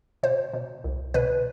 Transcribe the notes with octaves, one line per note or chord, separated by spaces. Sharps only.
B2 C5
B2
C2
B2 B4